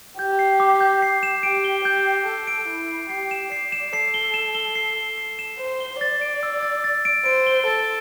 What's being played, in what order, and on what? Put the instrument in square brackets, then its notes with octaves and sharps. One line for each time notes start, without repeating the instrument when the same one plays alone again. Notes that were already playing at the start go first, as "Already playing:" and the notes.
[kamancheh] G4 [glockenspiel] G6
[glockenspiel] C7
D6
G6
C7
E7
[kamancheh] G4 [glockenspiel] D7
[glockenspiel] G7
[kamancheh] G4 [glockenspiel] G6
[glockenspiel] C7
[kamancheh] A4 [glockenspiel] G6
[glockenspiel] D7
[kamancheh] E4 [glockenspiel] G6
[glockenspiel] C7
[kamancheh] G4 [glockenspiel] C7
[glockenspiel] E7
[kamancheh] D5 [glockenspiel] C7
[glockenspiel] E7
[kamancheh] A4 [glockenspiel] C7
[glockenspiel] G7
E7
G7
C7
G7
C7
E7
[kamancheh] C5 [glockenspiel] E7
[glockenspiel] G7
[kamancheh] D5 [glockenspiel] A6
[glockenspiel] D7
E6
A6
A6
D7
[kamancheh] C5 [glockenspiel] D7
[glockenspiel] G7
[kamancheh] A4 [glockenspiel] A6